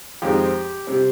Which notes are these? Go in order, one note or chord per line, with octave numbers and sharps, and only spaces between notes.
F2 D#3 G#3 C4 D#4 G4
C3 G3 C4